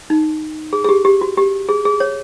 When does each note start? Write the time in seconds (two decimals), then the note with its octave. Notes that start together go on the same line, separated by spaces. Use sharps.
0.10 D#4
0.73 G#4
0.84 G#4
0.89 G4
1.05 G4
1.21 F#4
1.37 G4
1.69 G#4
1.85 G#4
2.00 C#5